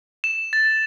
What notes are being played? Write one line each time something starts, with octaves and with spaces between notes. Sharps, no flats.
E7
A6